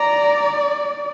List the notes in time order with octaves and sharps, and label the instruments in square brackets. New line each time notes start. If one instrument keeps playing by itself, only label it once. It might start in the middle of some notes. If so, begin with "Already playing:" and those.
Already playing: [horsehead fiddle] D5 [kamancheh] A#5